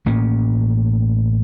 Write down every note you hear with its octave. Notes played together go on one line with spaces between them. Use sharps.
A1 A2 A#3 C#4